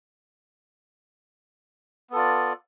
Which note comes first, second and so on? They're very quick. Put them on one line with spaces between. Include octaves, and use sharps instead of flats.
B3 A4 F4 D5